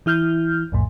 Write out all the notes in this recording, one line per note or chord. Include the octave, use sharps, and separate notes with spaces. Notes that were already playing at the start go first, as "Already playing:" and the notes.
E3 E4 F6 G6
B1 F2 A2